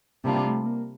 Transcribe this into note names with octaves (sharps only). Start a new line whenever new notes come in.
C3 G3 A#3 D4 F4
A3
A3
A#3